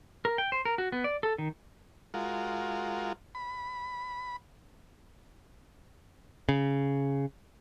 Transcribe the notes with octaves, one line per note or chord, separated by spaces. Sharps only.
A#4
G5
C5
A#4
F#4
B3
D5
A4
D#3
G#3 F4 F#4 A#4
B5
C#3